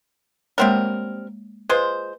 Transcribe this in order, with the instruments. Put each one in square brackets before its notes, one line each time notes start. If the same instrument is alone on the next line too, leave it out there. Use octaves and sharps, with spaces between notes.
[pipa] G3 C4 A#4 [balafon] G#3 A#3 C#5
[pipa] G#3 F4 C5 [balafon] B4